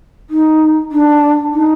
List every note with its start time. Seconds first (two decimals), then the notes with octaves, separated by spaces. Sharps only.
0.30 D#4
0.92 D4
1.53 D#4